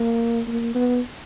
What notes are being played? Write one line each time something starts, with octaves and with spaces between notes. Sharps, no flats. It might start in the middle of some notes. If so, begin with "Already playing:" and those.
Already playing: A#3
A#3
B3